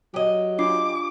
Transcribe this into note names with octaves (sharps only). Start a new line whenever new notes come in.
F#3 G4 D#5
D4 F4 D6 C7